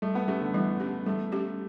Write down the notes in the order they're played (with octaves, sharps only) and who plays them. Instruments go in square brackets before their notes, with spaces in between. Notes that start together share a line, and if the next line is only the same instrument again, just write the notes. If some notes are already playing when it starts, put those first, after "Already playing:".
[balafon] G3 [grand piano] A3
[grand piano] B3
[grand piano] A3 [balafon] C#4 G4
[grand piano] D3
[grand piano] E3 [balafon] G3
[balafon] C#4 G4
[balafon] G3 [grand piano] A3
[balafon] C#4 G4